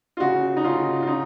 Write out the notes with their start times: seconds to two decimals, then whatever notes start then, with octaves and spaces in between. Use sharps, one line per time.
0.17 F4
0.20 C#3 F#4
0.57 D#4
0.64 C#3 F4
1.02 F4
1.07 D#4